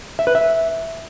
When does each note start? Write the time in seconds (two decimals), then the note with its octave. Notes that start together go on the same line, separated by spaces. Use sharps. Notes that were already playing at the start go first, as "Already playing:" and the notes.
0.19 E5
0.27 B4
0.35 E5